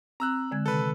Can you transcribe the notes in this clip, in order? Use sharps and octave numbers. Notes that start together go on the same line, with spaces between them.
C4 A#5 E6 F#6
D3 G#3 G#6
C3 D#3 A4 B4